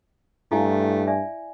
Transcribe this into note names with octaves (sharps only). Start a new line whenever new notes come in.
G2 A3 E4 F5 G#5
D5 E5 G#5